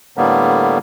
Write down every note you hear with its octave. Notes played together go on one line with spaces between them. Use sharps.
A2 D3 G3 A#3 B3